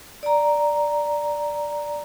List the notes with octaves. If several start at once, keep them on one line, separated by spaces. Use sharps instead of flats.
D5 A#5